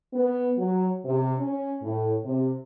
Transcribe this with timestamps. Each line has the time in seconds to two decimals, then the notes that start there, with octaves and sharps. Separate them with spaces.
0.13 B3
0.57 F#3
1.04 C3
1.38 C#4
1.82 A2
2.24 C3